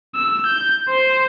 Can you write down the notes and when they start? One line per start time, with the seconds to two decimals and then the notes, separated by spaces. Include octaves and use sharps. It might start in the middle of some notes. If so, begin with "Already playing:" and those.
0.15 E6
0.46 G6
0.89 C5